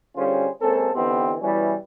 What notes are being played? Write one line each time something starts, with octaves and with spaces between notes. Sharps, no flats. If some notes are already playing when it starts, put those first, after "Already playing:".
D3 G3 C#4 F4 G#4 C5
G#3 A#3 C4 C#4 A4
D3 E3 B3 C4 D#4 G4
B2 E3 G3 C#4 E4